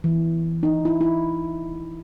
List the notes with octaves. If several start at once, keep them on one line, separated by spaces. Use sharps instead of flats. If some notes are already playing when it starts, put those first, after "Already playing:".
E3
D#4
E4
E4